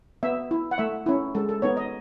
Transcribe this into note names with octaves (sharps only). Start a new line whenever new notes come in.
B3 E5
E4
F#5
A3 E5
C#4 E4
G#3 A4
A4
B3 D#4 C#5
D#5